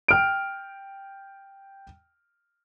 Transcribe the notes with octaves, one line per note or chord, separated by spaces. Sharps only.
G5 F6 D7